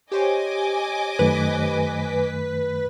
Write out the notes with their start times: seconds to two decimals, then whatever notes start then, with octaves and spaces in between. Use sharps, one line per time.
0.12 G4 C5 C#5 D#5 G#5 D6
1.19 F#2 D#3 A3 B4